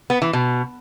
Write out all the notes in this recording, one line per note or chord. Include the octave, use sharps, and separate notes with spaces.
B3
E3
B2